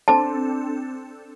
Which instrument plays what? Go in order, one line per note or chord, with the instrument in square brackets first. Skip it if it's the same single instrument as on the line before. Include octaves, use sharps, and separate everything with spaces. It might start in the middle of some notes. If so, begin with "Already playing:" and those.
[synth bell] C4 D4 A4 [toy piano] A5